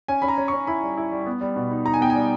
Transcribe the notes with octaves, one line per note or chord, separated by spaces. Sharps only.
C#4 G#5
C#4 B5
A#5
C#4
C#4 C#6
E4 B5
G3
E4
G3
B3
G3
B2
D#4
D#4 A#5
G#5
B3 G5
G#5
G3